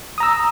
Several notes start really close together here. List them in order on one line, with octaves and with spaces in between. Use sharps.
D#6 A#5 E6